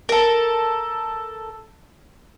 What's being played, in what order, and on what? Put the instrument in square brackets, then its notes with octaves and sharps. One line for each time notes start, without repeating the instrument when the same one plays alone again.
[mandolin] A4 A#4